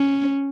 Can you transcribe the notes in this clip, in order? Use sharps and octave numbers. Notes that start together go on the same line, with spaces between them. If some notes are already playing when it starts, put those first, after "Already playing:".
Already playing: C#4